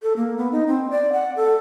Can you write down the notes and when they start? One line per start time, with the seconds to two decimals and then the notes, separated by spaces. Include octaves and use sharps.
0.02 A4
0.17 A#3
0.38 B3
0.52 D#4
0.67 C4
0.91 D5
1.13 F#5
1.36 A4